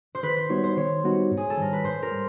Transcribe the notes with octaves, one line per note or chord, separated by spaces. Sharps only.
C5
D#3 B4
C5
G3 B3 D#4 F#4 C#5
C5
D#3 C#5
G3 B3 D#4 F#4
G#2
G#4
A4
D#3 G3 A#4
B4
G#2 C5
A#4
G3